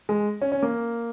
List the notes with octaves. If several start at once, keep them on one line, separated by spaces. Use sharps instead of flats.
G#3
C#4
C#4
A#3